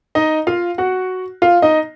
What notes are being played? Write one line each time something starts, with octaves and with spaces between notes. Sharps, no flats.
D#4 D#5
F4 F5
F#4 F#5
F4 F5
D#4 D#5